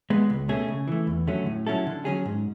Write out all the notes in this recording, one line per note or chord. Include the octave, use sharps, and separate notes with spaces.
G#3 B3
C#2
B2 A3 C#4 G#4
C#3
E3 A3
E2
D3 F#3 A3 C#4
A2
F#3 C#4 E4 A4
D3
F#3 C#4 G#4
G#2